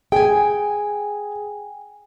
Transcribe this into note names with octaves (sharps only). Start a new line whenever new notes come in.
G#4 G5 G#5